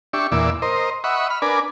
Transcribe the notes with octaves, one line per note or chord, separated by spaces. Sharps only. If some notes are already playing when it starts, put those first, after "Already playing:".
D4 G4 E5 C#6
E2 A#2 D5 E5
A#4 C5 D#5
D#5 E5 F#5 B5 C#6
B5 F6
D4 A#4 B4 D5 G#5